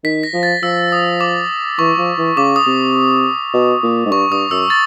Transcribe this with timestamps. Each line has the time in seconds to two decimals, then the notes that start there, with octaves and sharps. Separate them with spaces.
0.04 D#3 B6
0.23 A#6
0.34 F3
0.43 A6
0.62 F3 E6
0.92 D#6
1.21 D6
1.79 E3 C#6
1.98 F3
2.18 E3
2.37 C#3 D6
2.56 D#6
2.66 C3
3.54 B2
3.83 A#2
4.06 G#2
4.11 G2 C#6
4.31 G2 D#6
4.51 F#2 E6
4.70 A6